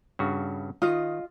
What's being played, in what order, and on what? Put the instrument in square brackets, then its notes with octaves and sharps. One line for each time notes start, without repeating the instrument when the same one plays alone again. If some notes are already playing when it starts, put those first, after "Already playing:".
[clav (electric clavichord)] G2 C#3 F#4
[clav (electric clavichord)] D#3 [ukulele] F4 D#5